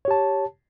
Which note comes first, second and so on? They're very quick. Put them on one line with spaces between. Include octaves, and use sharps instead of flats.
C#5 G4 A5